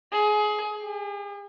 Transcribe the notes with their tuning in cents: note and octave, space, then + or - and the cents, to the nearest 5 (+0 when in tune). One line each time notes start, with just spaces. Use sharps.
G#4 +25
G#4 -45